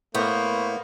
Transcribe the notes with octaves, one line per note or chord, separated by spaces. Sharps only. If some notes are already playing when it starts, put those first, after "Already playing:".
A2 A#3 B3 C5 C#6